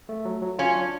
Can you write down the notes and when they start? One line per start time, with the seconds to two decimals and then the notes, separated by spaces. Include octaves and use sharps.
0.09 A3
0.25 F#3
0.42 F#3
0.59 C#4 F4
0.75 D4